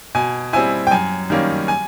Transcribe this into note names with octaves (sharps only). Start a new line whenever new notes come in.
B2 G#5
G3 C4 E4 G#5
G5
F#2 G#5
D#3 G3 A#3 C#4
G#5